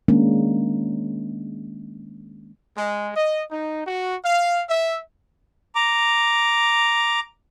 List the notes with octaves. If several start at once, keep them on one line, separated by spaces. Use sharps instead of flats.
D#3 G#3 A#3 C#4 D4
G#3
D#5
D#4
F#4
F5
E5
A#5 D6